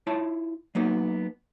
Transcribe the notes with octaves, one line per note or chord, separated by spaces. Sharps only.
E4 F4 C#5 A5
F#3 A#3 B3 D#4